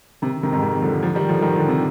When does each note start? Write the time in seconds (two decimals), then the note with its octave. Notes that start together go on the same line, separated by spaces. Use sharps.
0.22 C3 D#3
0.43 C3 D#3
0.52 F2 G#2
0.63 C3 D#3
0.82 D3 F3
1.03 D3 F3
1.15 D#3 G3
1.29 D3 F3
1.42 D#3 G3
1.55 D3 F3
1.68 C3